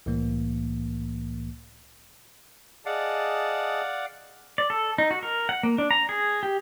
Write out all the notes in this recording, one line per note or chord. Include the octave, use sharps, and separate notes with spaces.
C2 A2 E3 A#3
G#4 D5 D#5 F5 F#5 A5
D5
A4
D#4
F#4
A#4
F#5
A#3
D4
A#5
G#4
G4